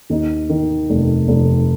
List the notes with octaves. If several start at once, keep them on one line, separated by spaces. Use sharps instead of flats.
D#2 D#4
D#3
F1
F1